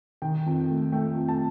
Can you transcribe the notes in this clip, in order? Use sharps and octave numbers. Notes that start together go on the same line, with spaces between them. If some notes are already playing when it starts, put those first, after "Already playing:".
D#3 G5
F2
A3
A3 G5
F2
A5